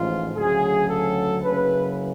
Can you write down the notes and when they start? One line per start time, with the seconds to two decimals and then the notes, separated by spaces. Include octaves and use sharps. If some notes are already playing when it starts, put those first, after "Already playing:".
Already playing: A1 G#2 F3 F4
0.36 D2 C#3 F#3 G#4
0.89 A4
1.43 F#1 F#2 C#3 B4